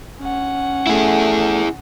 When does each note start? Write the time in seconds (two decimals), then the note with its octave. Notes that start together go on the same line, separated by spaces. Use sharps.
0.20 C#4 F#5
0.87 A3 E4 G#4